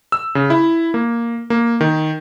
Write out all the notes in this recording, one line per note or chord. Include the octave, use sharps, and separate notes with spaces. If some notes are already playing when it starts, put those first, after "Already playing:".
E6
C#3
E4
A#3
A#3
D#3